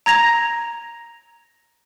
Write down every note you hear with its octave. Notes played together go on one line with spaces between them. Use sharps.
A#5 G#6 A#6 F7